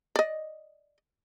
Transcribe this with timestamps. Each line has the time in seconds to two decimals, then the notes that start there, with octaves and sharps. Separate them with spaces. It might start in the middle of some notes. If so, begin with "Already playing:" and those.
0.16 D5 D#5